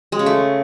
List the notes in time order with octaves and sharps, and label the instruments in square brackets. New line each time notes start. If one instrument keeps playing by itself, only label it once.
[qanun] G#3
C#3
A3